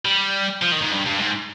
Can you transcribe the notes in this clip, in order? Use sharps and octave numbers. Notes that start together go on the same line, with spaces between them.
G3
F3
D#3
G#2
G2
G2
G#2